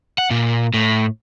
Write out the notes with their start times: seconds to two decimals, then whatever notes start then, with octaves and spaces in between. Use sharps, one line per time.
0.18 F#5
0.31 A#2
0.74 A2